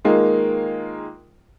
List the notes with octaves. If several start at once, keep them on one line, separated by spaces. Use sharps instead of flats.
D#3 G#3 A#3 F4